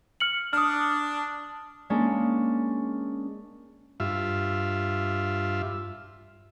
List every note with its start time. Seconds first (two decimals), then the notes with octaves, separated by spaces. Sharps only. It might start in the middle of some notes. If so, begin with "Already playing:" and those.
0.20 F6 C#7 F#7
0.53 D4 D#6 F6
1.90 G#3 A#3 C#4 D4 G#4
4.00 G2 F4 E5